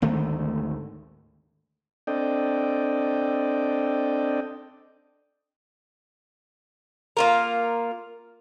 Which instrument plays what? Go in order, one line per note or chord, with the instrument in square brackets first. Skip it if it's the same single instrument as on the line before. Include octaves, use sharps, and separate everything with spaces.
[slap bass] G#1 D2 D#3 A3
[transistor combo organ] C4 D4 A4 D5 D#5 G5
[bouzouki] A#3 F4 A#4